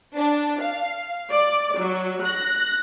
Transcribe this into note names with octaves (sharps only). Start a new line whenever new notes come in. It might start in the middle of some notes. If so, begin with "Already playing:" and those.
D4
F5
D5
F#3
F#6 A#6